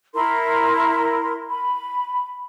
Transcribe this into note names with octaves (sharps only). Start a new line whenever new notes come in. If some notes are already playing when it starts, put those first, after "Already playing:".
E4 A#4 C6
B5